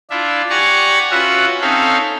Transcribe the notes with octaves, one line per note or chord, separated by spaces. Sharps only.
D4 E4 F4 E5
G4 D5 F#5 G#5 A#5 C#6
C#4 F4 F#4 B4 E5 F#5
C4 C#4 D#4 A4 E5 F5